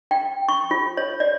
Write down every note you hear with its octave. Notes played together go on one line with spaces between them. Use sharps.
G5
C#6
F4
C#5
D5